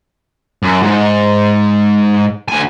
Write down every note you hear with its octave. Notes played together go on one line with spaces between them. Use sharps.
F#2
G#2
D2 G#5